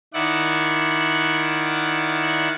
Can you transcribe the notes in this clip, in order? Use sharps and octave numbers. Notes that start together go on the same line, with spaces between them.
D#3 E4 D5 F#5